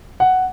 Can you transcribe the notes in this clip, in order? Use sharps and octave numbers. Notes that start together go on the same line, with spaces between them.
F#5